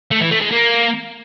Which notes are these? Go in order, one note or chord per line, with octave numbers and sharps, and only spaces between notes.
A3
E3
A3
G#3
A#3